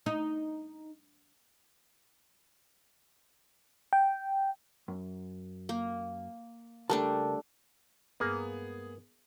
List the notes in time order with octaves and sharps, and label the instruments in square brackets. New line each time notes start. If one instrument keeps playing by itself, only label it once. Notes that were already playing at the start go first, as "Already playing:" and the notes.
[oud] D#4
[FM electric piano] G5
[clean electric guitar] F#2
[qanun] A#3
[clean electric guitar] C#2 A#4 A5 [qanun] G3 A3 D4
[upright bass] G2 G#3 [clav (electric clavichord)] A#3 [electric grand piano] B3 G#4